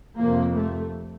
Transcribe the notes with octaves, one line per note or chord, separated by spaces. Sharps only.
F2 C3 A#3
A3